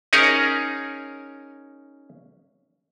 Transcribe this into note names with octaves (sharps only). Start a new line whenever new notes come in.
C#4 D#4 G#4 A#4 C#5